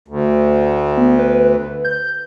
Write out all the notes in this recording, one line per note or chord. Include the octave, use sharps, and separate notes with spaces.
D2
B3
B4
G6